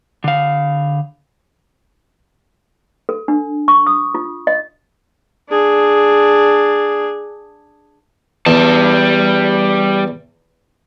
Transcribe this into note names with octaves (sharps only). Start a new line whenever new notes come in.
D3 F5
A4
D4
C#6
D#6
F4
D#5
D4 G#4
E2 G3 A5